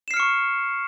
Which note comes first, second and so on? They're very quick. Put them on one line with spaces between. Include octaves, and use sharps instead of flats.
E7 C7 F6 C#7 C#6